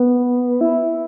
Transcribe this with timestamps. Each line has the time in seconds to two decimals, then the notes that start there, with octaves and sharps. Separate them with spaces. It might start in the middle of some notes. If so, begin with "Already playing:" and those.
Already playing: B3
0.61 E4